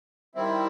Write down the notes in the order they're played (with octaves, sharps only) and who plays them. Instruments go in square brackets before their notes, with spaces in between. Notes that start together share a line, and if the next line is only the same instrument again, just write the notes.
[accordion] D#3 G3 C4 E4